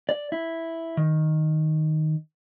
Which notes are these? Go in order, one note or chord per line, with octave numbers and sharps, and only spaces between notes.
D5
E4
D#3